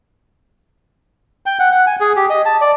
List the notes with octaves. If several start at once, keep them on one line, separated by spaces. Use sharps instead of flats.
G5
F#5
F#5
G#5
G#4
G4
D#5
A5
D5